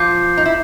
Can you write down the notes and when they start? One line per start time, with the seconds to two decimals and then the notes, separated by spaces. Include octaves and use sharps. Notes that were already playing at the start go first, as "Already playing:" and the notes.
Already playing: F3 F4 D6 G6 C7
0.37 D#4
0.45 E4